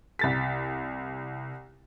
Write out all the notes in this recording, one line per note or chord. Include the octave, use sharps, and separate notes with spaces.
C2 A6 B6